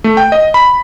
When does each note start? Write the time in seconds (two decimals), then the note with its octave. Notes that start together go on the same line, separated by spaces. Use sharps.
0.04 A3
0.17 G5
0.32 D#5
0.54 B5